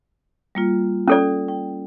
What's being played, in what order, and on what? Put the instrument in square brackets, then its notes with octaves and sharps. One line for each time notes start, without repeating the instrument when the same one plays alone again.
[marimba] G3 A#3 F4
[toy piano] C#4 A4 D5
[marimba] G5